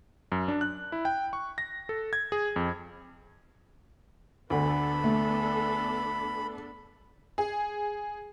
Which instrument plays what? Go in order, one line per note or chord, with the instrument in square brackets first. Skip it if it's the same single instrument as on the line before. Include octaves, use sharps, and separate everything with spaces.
[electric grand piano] F#2
D4
F#6
E4
G5
C#6
A#6
A4
G#6
G#4
F2
[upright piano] D2 D3 [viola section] B3 D4 A4 [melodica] B5
[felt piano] A3
[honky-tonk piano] G#4